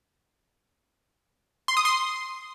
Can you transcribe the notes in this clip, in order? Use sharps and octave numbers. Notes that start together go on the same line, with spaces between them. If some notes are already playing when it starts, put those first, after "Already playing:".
C6
D#6
C6